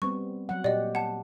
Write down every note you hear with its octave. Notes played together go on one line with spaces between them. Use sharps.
G3 B3 C4 C#6
F#3 F#5
A#2 G4 D5 D#5
F#5 A5